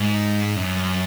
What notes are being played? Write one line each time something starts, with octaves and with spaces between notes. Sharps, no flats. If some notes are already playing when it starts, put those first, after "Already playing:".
Already playing: G#2
F#2